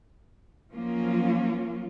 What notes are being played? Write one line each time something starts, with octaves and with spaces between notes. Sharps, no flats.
F3 F#3 A#3 C#4 F4